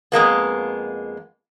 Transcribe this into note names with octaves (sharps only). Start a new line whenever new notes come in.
F2 G#3 A#3 B3